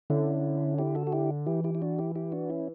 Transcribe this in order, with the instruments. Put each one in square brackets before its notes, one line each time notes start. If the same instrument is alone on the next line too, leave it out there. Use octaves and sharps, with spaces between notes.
[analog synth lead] D3 [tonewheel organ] C#4 E4
[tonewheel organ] E4 G4
F#4 A4
F#4
E4 G4
[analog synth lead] E3 [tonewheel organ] E4 G4
[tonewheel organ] E4 G4
E4
D4 F#4
E4 G4
E4 G4
D4 F#4
C#4 E4